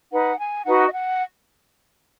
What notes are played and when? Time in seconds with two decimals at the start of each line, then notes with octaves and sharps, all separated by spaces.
0.12 D#4 B4 F#5
0.39 G#5
0.66 D#4 F#4 B4 F#5
0.86 D#5
0.93 F#5